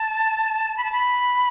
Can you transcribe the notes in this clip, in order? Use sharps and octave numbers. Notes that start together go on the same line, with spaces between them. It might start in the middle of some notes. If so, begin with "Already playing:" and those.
Already playing: A5
B5
A5
B5